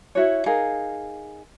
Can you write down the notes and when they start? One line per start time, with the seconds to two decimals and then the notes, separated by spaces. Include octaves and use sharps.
0.15 E4 F#4 C#5
0.46 D#4 G#4 A#4 F5